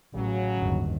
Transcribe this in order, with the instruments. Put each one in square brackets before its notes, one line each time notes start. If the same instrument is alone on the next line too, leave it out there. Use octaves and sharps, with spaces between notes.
[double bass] A1 [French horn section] C#3 F#3
[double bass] G1 D#2